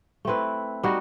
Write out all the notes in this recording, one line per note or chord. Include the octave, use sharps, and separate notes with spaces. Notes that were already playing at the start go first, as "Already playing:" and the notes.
A3 C4 E4 B4
G3 D#4 F#4